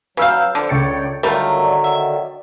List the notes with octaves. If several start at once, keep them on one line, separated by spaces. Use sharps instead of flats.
C#3 F#3 B4 F5 E6 G6
D3 F3
C#2 C#5 D5 G5 A6 C#7
D3 D#3 F#3 G3 A3 F4 A#4 C#5
D5
E5